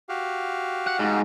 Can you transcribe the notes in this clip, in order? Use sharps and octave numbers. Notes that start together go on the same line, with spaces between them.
F#4 G4 F5
F#5
G#2